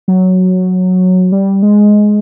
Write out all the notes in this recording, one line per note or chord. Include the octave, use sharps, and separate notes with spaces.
F#3
G3
G#3